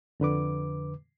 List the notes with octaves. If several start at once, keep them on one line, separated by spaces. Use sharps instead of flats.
F2 D3 B4 D6